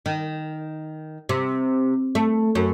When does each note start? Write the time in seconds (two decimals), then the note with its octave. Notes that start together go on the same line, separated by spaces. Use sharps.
0.06 D#3
1.29 C3
2.15 A3
2.55 F#2